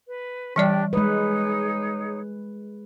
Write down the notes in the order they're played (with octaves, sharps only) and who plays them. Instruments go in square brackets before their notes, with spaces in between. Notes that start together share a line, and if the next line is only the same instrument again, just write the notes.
[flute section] B4
[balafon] E3 G3 D5 [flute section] D4 G4 G5
[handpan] G#3 B4 [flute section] D#4 G#4 C#5